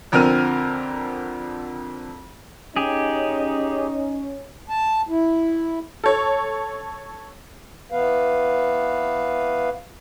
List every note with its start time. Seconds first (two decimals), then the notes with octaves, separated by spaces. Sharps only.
0.12 F2 D3 C4 A#4 F6 D#7
2.76 C#4 D#4 G4 G#4
4.69 A5
5.09 E4
6.04 A4 C#5
7.92 E3 B3 B4 F5